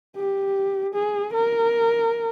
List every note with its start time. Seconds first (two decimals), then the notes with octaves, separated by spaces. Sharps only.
0.16 G4
0.94 G#4
1.34 A#4